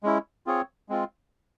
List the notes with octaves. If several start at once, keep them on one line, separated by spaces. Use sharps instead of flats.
G#3 C#4 E4
C4 F4 G#4 C#5
G#3 C4 F4